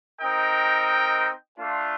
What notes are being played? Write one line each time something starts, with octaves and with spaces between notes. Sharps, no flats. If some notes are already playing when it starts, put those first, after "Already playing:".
C4 D#4 A#4 D#5 G5
A3 D4 F4